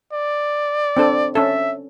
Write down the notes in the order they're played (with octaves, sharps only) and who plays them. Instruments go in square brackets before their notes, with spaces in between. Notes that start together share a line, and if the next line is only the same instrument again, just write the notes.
[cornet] D5
[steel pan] C4 D4 A4
[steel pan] C#4 A4 [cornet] E5